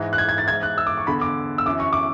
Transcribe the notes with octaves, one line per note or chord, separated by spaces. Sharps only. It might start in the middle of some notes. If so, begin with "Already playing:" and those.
Already playing: G#2 E3
F#6
G#6
G#6
A6
G#2 E3 G#6
F#6
E6
D6
C#6
E2 D3 B5
D6
E6
F#2 E3 D6
C#6
D6